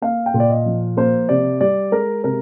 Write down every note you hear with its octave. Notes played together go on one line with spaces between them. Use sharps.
A#3 F5
G5
A#2
D5
D#5
F3
A#3 C5
C3 D5
G3 D5
G#3 A#4
C3 A#4